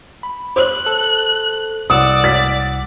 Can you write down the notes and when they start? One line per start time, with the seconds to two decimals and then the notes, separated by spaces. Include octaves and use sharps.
0.23 B5
0.56 C5 F#6
0.86 A4
1.90 C2 D5 F#5 D#6 E6
2.24 A6 B6